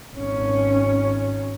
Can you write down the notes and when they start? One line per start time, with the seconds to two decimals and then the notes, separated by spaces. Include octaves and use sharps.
0.15 G#1 C#4